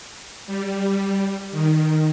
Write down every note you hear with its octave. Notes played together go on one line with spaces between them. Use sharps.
G3
D#3